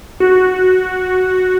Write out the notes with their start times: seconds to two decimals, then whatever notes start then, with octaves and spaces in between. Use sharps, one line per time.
0.20 F#4